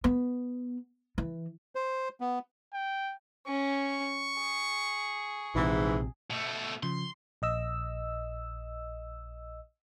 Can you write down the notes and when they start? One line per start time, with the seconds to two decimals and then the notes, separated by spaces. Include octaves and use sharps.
0.04 B3
1.18 E3
1.75 C5
2.20 B3
2.74 G5
3.47 C#4 C#6
4.38 G#4
5.55 A#1 G#2 C3 E3
6.30 B2 A3
6.83 C#3 F3 C6
7.42 A#1 D#5 E6